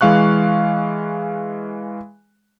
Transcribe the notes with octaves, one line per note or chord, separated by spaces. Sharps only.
E3 G#3 F5 C#6 F#6